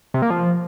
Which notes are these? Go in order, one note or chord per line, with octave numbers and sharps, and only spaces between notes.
C3
A#3
F3